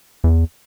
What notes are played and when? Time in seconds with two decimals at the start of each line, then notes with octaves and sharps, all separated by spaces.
0.24 E2